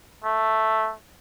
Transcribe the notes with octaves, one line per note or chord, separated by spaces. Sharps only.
A3